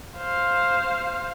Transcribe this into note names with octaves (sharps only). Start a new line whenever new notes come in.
C5 F5